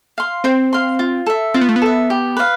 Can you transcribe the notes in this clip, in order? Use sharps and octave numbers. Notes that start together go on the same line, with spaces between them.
F5 C6
C4 C5
F5 C6
F4
A4 E5
C4 F4
B3
A3
B3
A4 E5
G4
B4 D5 F5